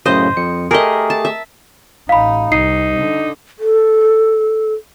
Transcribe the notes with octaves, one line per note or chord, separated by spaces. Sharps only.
F#2 A2 C#3 C5 D#5
F2 C#7
A3 G4 G#4 A#4 D#5
A5
E5
A1 D#4 F5 B5
C2 D#4 C7
D3
A4